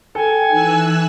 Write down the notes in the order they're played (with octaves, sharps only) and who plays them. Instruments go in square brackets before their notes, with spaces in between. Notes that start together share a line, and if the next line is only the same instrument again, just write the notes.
[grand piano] A4 [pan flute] G5 [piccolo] G#5
[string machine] E3 E6 F#6 [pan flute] D#4